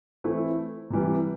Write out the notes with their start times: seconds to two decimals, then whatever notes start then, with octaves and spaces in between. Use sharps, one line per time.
0.24 E3 A3 C4 E4
0.90 C3 E3 G3